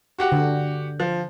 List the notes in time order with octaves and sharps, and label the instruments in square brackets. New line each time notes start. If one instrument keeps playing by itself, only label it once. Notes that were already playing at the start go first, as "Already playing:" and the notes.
[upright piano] F#4 G4 F#5
[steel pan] D3
[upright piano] F3